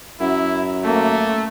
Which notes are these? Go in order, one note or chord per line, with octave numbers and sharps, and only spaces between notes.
F#2 E4
A3 A#3